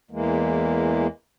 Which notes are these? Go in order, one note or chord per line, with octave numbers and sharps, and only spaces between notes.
E2 E3 G#3 A#3